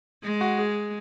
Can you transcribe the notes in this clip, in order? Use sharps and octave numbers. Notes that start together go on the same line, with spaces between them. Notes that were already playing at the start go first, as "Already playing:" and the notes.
G#3
F#4
G#4